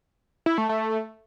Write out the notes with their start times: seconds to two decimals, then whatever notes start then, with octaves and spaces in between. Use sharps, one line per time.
0.46 E4
0.58 A3
0.69 A3